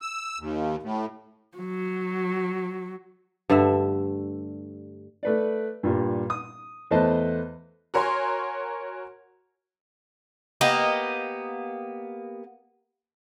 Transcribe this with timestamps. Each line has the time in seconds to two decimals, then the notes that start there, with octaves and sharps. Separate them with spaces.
0.02 E6
0.39 D#2
0.83 A2
1.58 F#3
3.49 G2 D3 A3 E5
5.23 A3 B4 D5
5.83 G2 A#2 G3
6.30 D#6
6.91 E2 A3 B4 C5 D#5 A5
7.94 F#4 A#4 C#5 G#5 C6
10.61 A#3 B3 G4 D#5